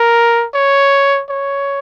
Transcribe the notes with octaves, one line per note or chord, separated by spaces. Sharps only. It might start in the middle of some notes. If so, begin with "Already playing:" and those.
Already playing: A#4
C#5
C#5